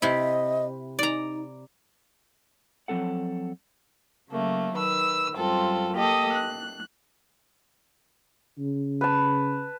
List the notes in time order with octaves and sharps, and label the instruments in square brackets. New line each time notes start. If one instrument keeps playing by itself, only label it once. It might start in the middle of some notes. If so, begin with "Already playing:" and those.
[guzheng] C3 E4 [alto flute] D#5
[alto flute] D#4 [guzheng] D5 A#5
[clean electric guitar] F3 F#3 C4 A4 F#5
[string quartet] C#3 F#3 A3 A#3
D#3 B4 E6
F#2 G3 C4 F4 A4
A#3 G4 A4 D#5 D#6
F#6
[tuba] C#3
[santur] B4 A5